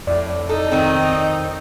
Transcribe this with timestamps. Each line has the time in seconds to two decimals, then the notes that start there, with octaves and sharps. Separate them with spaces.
0.07 F2 A2 D5
0.49 D#4 A4
0.72 D#3 C4